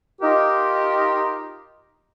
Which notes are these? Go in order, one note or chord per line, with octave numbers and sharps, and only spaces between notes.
D#4 F4 G4 A#4